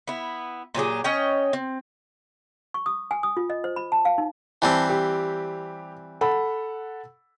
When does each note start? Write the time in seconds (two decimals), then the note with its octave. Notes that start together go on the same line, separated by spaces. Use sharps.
0.07 B3 E4
0.75 A#2 F#3 G4 G#4
1.04 C#4 C#5 D#5 G5
1.53 C4
2.74 C#6
2.86 D#6
3.11 G#5
3.23 D#6
3.37 F4
3.50 D#5
3.64 C5
3.76 B5
3.92 A5
4.05 F5
4.18 D#4
4.62 E3 G3 C4 A5
4.90 G4
6.21 A4 F#5 B5